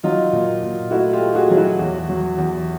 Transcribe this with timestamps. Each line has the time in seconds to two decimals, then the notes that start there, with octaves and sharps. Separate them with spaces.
0.03 F#3 D#4 F4
0.33 A#2
0.63 A#2
0.91 A3 E4 F#4
1.13 F4 G4
1.21 A3
1.35 F#4 G#4
1.50 F#3
1.57 E4 F#4
1.79 E2
2.09 F#3
2.38 E2